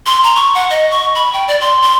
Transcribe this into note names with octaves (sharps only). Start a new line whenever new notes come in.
C6
A#5
C#6
F#5
D#5
C#6
B5
G5
D5
C6
C6